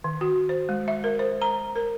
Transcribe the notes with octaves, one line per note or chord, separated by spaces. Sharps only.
D#3
F#4
C5
G#3
E5
A#4
C5
A#5
A#4